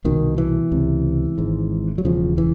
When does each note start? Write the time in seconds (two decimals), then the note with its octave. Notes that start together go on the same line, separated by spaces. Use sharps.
0.05 C2 B2 D#3
0.38 E3
0.72 C#2 C3
1.38 G#1 G#2
1.98 F#3
2.05 E1 E2 C#3 F3
2.38 E3